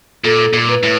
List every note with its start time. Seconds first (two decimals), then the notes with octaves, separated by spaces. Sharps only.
0.24 A#2 A4
0.53 A#2
0.68 B4
0.83 A2